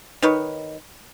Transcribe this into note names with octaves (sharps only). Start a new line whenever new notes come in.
D#3 D#4 B4 C#5